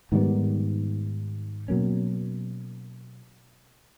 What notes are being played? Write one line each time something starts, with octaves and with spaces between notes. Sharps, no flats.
G#2 D#3 G3 B3
B2 F#3 A#3 C#4